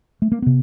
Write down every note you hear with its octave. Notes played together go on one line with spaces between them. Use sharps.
A3
A#3
C3 B3